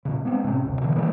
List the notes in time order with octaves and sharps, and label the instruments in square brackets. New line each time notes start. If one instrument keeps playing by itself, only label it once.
[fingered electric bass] A#2 C#3
G#3 B3 C4
A2 C3 C4 C#4
F#1 D2 C3
B2 D3 E3
D#3 E3 G#3 A#3